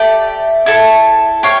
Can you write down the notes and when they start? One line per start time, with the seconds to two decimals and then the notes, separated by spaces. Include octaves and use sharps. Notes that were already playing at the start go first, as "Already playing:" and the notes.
Already playing: A3 G4 D5
0.66 E4 A4 E5 A5
1.43 G4 C#5 F5